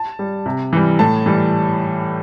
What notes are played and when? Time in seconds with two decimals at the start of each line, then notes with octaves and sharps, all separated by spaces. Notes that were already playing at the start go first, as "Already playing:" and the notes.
Already playing: A5
0.19 G3
0.46 C3
0.73 E3 G3
0.99 A2 A5
1.26 E3 G3